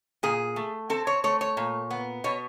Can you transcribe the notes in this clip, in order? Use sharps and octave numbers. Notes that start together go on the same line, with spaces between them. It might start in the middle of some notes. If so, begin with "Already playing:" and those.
A#2 G#4
A3
C4 A4
C#5
A3 C#5
C#5
A#2
B3
B2 C#5